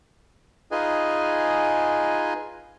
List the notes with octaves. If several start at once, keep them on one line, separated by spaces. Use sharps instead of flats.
D#4 F4 G#4 B4 D#5 G#5